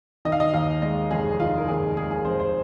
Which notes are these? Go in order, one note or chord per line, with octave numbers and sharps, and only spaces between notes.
D#3 D#5
F5
D#5
D#2 F5
G#3 D#5
F1 G#4
D#3 F4
A#4
D#2 G#4
G#3 G#4
G#4
F1 C5
C5